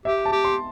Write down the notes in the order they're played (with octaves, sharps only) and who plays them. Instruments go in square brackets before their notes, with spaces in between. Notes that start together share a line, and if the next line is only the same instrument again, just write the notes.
[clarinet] G4 [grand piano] E5
[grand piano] A5
[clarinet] G4
[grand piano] C6